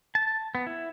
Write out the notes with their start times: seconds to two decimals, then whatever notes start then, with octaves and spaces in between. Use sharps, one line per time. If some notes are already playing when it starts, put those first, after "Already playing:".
0.15 A5
0.55 B3
0.67 E4